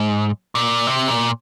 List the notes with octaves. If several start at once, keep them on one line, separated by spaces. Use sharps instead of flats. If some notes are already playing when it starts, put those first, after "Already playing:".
Already playing: G#2
A#2
C3
A#2